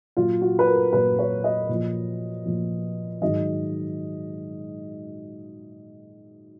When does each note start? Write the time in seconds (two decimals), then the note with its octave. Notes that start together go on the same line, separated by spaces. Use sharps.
0.17 A#2 F#3 F4
0.41 F#4
0.59 B4
0.67 A#4
0.93 A#2 F#3 B4
1.19 C#5
1.44 D#5
1.69 A#2 F3
2.45 A#2 F3
3.21 G#2 D#3 F#3 D#5